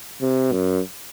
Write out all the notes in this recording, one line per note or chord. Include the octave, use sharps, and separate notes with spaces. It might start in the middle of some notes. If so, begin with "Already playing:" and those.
C3
F#2